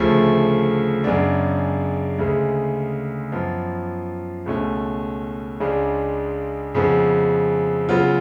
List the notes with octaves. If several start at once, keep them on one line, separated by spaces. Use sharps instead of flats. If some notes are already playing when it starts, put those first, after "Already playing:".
Already playing: D2 C#3 F3 A3
F#2 C#3 G#3 B3 D4
D2 C#3 G#3
F#2 F3 B3 F4
C#2 B2 A3 C#4
C#2 C#3 G#3 D4
F2 C#3 G#3 B3
C#3 F#3 B3 F4